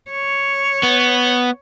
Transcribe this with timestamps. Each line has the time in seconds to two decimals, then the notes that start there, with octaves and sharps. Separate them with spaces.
0.11 C#5
0.83 B3